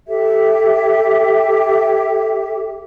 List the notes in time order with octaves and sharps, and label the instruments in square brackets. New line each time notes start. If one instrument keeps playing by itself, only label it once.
[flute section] G4 A4 E5